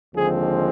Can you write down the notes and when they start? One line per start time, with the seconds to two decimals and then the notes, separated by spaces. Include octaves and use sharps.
0.15 D#2 D3 F3 G#3 C4 G#4